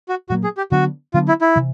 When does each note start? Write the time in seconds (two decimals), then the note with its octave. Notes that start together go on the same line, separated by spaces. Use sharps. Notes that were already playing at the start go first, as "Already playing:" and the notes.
0.09 F#4
0.29 A#2 F#3 A#3 F#4
0.44 G#4
0.57 G4
0.71 D3 F#3 B3 D4 F#4
1.14 D3 F#3 B3 D4 F4
1.28 E4
1.41 E4
1.56 C3 E3